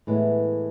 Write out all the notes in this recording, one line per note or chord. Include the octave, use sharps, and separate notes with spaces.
A2 E3 G#3 B3